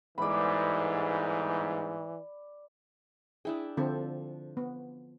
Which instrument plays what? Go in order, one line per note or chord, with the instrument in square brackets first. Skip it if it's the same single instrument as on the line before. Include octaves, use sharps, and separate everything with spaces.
[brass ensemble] G1 G#2 [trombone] E3 [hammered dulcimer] D5 B5
[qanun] D4 E4 G5 [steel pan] G#4
[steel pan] D3 C4 A4 [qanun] F3
[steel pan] B3